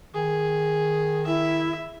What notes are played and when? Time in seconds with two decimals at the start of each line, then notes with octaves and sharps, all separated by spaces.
0.14 D#3 G#4
1.27 E4 E5